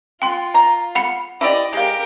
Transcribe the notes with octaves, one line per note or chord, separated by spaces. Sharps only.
F4 G5 C6
A#5
F#5 B5 C#7
E4 G4 D5 D#5
G#3 G4 A#4 F5